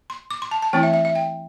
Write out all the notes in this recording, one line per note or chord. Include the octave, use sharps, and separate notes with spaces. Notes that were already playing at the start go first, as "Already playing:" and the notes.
C6
D6
C6
A5
A5
E3 A3 C4 E4 G5
E5
E5
E5
G5